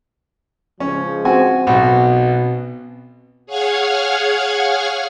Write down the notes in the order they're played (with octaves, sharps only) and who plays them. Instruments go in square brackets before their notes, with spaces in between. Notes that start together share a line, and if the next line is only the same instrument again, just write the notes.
[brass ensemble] C#2 F3 G#3 [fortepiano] C#4
[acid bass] C4 [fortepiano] F#4 G#5
[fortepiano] B1 F#4 [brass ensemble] B2
[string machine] G#4 C#5 F5 F#5 F6 G#6